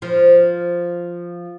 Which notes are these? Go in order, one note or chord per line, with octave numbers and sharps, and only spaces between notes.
F3